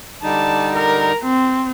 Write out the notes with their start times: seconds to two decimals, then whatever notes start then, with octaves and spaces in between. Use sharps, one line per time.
0.23 D3 G3 D#4 A5
0.76 A#4
1.23 C4